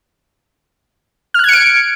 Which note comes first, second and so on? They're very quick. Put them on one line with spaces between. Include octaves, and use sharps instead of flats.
F6 F#6 G#6 C#7 D7